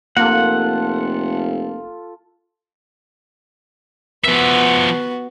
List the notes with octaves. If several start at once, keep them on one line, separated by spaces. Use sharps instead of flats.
F1 A#3 F4 A4 F#5
F3 B3 F#4 E5